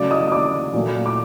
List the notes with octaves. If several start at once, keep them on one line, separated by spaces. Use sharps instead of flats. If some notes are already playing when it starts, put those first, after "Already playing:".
Already playing: C#3 F#3 A3 D5 D6
D#5 D#6
D#6
D5 D6
A#2 F#3 A3
D6